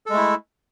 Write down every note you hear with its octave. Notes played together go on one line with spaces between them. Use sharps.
G#3 A3 E4 A4